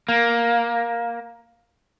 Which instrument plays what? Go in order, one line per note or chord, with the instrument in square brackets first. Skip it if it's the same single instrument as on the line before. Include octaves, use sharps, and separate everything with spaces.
[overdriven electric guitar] A#3